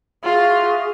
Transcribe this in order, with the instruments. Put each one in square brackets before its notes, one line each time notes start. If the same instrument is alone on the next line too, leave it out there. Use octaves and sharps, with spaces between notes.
[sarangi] F4 [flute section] F#4 G#4 E5